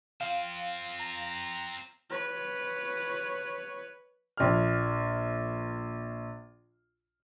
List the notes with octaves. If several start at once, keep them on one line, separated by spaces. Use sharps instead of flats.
C4 F4 F5
A#5
B4 C#5
A#1 F6